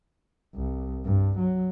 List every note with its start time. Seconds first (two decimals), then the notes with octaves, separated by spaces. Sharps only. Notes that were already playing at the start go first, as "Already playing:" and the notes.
0.55 C2
1.05 G2
1.39 F#3